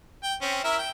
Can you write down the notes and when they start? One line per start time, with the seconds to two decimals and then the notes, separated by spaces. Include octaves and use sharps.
0.23 G5
0.42 C4 C#4
0.64 E4 A#4 E5
0.78 G5